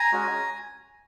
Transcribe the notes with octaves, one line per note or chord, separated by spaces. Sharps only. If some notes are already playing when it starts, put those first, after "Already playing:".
Already playing: G#5 A#5
G#3 C#4 F#4